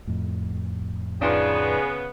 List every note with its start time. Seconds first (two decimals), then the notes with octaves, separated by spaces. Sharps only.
0.07 F2 A2
1.22 C#3 B3 D4 D#4 F4 G#4